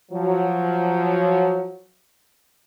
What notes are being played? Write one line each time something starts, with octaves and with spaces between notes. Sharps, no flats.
F3 F#3